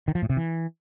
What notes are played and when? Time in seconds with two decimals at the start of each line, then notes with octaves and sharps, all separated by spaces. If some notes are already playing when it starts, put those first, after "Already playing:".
0.08 D#3
0.15 F3
0.22 A2
0.30 C3
0.37 E3